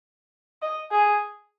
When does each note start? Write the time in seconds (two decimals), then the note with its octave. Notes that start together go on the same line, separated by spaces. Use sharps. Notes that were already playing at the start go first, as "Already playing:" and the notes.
0.62 D#5
0.91 G#4